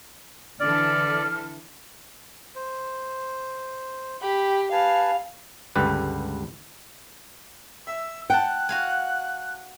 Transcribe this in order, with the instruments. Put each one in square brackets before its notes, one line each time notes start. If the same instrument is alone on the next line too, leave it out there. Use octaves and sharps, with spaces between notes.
[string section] D3 E3 A4 [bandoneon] D5 [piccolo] F6
[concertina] C5
[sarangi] G4 [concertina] B5
[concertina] B4 G#5 A5 [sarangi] F5
[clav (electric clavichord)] C#2 G2 D3 G4 B4
[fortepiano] E5 [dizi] E6
[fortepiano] F#5 A5 [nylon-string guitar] G5 [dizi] F#6
[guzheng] F#4 F5 G#5